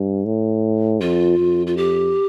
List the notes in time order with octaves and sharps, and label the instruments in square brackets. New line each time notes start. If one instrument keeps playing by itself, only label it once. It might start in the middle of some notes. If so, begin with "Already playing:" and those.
Already playing: [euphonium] G2
A2
[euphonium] F2 [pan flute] F4
[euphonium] F2
[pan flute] F4
G4